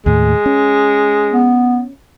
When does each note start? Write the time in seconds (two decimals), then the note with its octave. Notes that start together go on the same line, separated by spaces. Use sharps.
0.06 D#2 A2 G#3
0.46 C#4
1.33 B3